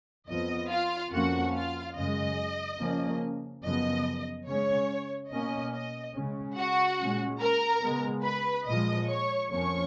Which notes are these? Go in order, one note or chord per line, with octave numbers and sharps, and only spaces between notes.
F2 F3 B3 D#5
F4 F5
F2 F3 A#3 C#4 F#4 F#5
F4 F5
F#2 C#3 G#3 D#5
C#3 F3 A#3 C#4
F#2 C#3 F3 B3 D#5
C#3 G#3 C#4 C#5
B2 A#3 C#4 D#5
D#5
C#3 G#3 C#4
F#4 F#5
A#2 G#3 C#4
A#4 A#5
C#3 G#3 B3
B4 B5
A#2 F3 G#3 D#5 D#6
C#5 C#6
F2 F3 A#3 C#4 C#5 C#6